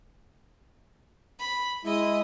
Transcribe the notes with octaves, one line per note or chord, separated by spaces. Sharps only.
B5
G#3 E4 D#5 D#6